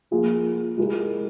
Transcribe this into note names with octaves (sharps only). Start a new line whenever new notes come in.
F3 A#3 F4 G#4
G#3 E4 G4 A#4